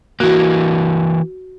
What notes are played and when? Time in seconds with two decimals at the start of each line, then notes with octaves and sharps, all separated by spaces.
0.20 E3 A#3 F#4